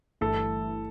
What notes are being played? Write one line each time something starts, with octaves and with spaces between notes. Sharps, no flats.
G1 G2 E3 A3 E4 A4